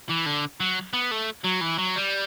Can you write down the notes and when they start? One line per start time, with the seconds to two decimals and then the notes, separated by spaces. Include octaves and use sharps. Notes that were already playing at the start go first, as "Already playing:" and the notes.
0.09 E3
0.26 D3
0.60 F#3
0.94 B3
1.11 A3
1.45 F#3
1.61 E3
1.79 F#3
1.96 G3